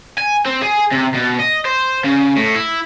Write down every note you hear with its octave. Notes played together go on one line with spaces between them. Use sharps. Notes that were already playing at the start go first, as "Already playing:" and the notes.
G#5
C4
G#4
C3
B2
D#5
C5
C#3
A2
E4